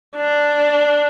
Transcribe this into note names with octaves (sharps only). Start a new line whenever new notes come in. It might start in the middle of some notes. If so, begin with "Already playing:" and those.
D4